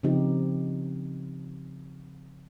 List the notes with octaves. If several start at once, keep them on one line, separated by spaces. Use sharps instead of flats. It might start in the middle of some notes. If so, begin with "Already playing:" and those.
C#3 F3 C4 D#4 G4